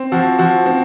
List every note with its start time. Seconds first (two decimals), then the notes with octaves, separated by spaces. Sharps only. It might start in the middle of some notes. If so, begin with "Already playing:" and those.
Already playing: C4
0.12 F3 F#4
0.39 F3 F#4
0.66 C4